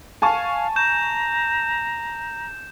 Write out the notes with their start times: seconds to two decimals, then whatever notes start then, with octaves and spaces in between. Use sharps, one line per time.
0.22 F5 G#5 A5 C#6
0.76 A#5 G6 E7